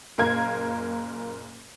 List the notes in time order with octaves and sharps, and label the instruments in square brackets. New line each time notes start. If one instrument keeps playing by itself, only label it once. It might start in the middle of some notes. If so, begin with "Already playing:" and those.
[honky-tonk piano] F#1 A#2 A#4 F5 G#6